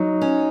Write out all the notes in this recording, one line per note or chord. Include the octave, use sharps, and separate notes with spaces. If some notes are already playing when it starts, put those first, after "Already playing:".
Already playing: F#3 D#4
C#4